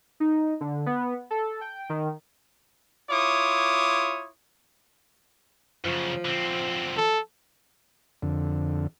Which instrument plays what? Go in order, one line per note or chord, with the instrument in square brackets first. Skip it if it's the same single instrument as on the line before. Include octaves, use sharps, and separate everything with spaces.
[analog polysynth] D#4
D3
B3
A4
G5
D#3
[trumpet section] E4 F4 C#5 D6 D#6
[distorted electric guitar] F#2 C#3 [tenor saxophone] F3
[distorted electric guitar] D3 C4
[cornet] A4
[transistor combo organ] F2 D3